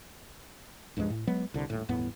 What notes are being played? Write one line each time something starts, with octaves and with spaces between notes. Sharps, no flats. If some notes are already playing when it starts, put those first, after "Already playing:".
C2 G2 F3 G#3
A2
F#3 G#3 B3
C2 D3
D#1 A2
G1 E2 A2 B3